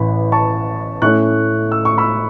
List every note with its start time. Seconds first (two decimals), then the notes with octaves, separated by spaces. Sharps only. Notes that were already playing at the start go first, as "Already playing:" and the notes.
Already playing: A1 A2 E3 B5
0.32 A5 C#6
1.02 A2 A3 C#4 E4 C#6 F#6
1.72 E6
1.85 C#6
1.98 B5 E6